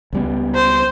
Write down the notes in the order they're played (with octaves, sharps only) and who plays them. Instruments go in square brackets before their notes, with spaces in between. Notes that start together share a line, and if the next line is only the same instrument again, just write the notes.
[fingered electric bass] C#2 G3 B3
[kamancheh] C5